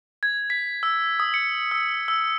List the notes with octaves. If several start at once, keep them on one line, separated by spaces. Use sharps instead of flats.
G#6
B6
E6
D#6
C#7
E6
E6